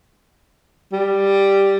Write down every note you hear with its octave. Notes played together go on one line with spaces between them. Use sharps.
G3